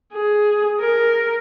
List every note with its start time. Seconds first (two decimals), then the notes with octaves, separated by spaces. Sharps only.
0.14 G#4
0.80 A#4